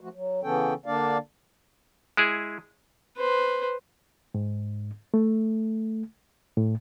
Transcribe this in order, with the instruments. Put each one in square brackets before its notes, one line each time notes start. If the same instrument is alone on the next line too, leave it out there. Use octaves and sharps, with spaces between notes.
[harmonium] F3 A3 F#4
F#3
C#3 E3 B3 C#4 A4 G5
D3 A#3 D4 D5 F5
[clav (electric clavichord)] G#3 E4 G#4
[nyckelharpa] B4 C5
[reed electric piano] G#2
A3
A2